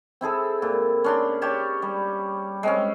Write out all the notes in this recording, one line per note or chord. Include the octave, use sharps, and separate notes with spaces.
C4 E4 G#4 A4
A#2
C#4 D4 C6
G4 C#5 A5
G3
G#3 C4 C#4